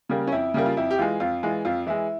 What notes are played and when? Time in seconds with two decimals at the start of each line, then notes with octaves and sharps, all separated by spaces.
0.09 C#3 G3 A#3
0.27 C#4
0.32 F2 E4
0.54 C#3 G3 A#3
0.66 F4
0.77 F2 E4
0.91 G4
0.98 E3 G#3 F4
1.20 F2 F4
1.43 E3 G#3
1.65 F2 F4
1.87 E3 G#3 E4